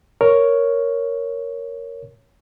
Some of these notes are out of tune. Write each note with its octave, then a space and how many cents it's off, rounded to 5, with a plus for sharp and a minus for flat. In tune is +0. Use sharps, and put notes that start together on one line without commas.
A#4 +0 C#5 +0